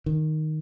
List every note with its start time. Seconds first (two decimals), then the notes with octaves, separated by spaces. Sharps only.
0.06 D#3